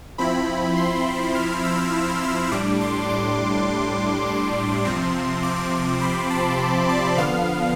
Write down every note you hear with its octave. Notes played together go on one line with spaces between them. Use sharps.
F3 C4 E4 B5
C6
F6
E6
E6
A2 G3 D4 D6
C6
D6
C6
C3 F3 C4
D6
B5
A5
D5
D3 F3 B3 F5